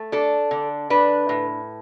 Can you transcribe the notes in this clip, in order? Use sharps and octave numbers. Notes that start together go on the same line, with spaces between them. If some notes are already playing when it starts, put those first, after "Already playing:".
Already playing: A3
D4 A4
D3
D4 B4
A2